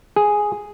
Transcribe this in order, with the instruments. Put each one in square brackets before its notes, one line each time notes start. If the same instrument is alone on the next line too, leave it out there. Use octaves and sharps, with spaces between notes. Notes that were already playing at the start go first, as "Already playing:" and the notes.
[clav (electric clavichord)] G#4